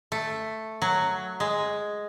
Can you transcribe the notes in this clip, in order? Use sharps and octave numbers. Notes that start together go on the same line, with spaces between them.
A3
F#3
G#3